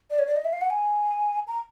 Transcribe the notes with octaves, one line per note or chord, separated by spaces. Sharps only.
D5
C#5
D5
D#5
E5
F5
F#5
G#5
A#5